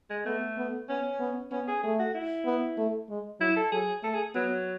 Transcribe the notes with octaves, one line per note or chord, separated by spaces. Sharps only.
G#3
A3 B3
B3
B3 C#4
B3
B3 C#4
G#4
A3 G#4
F#4
E4
B3
A3
G#3
F#3 E4
A4
F#3 G#4
A3 A4
G#4
F#3 B3